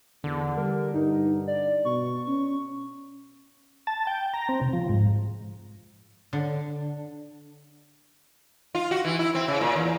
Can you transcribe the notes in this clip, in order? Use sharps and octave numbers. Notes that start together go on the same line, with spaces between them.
E2 D3
G3 A#4
G2 D#4
D5
B2 C#6
C#4
A5
G5
A#5
C4
C3
F3
G#2
D3
F4
F#4
E3
E4
C4
C#3
A#2
E2